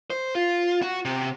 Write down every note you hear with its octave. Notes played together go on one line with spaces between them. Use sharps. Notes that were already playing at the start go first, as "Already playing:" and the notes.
C5
F4
F#4
C3